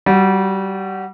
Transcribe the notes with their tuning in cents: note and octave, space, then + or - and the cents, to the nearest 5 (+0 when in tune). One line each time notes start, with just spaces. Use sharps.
G3 -20 F#4 +0